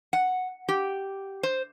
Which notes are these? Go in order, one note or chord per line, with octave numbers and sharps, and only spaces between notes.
F#5
G4
C5